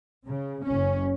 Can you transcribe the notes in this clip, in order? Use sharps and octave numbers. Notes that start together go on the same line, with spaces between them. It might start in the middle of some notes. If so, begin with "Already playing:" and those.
C#3
F#1 C#4